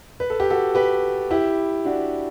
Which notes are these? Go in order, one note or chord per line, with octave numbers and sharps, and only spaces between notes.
B4
A4
G4
F#4 A4
G4 B4
E4 G4
D4 F#4